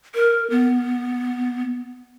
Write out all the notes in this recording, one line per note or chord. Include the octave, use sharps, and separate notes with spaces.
A#4
B3